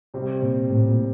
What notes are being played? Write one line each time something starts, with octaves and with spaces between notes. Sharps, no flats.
C3 G3 C4 G4
A#2
A2
A#2